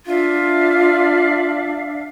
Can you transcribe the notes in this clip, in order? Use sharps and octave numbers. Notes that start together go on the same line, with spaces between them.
D4 F4 E5 F5